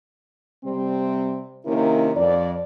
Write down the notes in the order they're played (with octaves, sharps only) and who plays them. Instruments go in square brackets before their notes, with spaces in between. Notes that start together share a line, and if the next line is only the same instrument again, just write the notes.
[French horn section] C3 G3 C4
C3 D#3 A#3 C#4 E4 A#4
F2 D5